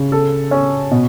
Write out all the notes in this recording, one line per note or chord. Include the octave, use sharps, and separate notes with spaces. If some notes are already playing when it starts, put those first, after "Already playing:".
Already playing: C#3
A4
C#4
B2